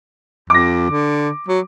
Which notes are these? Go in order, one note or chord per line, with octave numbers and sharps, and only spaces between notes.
F2 D6 A#6
D3
F#3